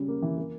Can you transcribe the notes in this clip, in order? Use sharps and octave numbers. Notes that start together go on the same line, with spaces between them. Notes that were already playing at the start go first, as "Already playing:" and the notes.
Already playing: C#3 G3
A#3
E3
A#3